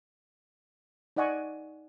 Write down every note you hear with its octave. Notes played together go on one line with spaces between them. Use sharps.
D#4 D5 D#5 F#5 G#5 C#6